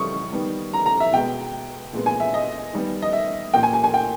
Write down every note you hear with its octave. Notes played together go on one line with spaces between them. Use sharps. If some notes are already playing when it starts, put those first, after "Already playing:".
Already playing: C#3 E3 G3 C#6 D#6
D#3 G3 B3
A#5
A#5
E5
B2 G#3 B3 G5
A#2 G#3 B3
G#5
E5
D#5
D#3 G3 B3
D#5
E5
A#2 A#3 G5
G#5
G#5
G#5
G5